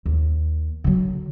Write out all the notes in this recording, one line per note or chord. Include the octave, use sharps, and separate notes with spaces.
D#2
D3 F#3